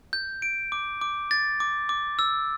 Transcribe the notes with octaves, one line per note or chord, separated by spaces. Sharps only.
G6
D7
D6
D6
A6
D6
D6
E6